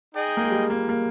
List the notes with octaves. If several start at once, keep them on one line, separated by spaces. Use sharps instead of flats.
D#4 G#4 D#5 G5
A#3
G#3
G3
A#3
A#3